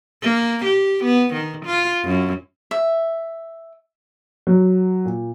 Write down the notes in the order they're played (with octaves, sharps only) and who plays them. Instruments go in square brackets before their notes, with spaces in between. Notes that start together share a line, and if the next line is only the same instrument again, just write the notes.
[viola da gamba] A#3
G4
B3
D#3
F4
F#2
[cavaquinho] E5
[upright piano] F#3
A#2